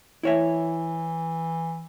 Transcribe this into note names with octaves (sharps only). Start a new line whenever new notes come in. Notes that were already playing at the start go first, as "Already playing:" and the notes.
E3 E4 C#5 E5